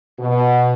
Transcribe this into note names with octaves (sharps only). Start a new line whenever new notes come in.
B2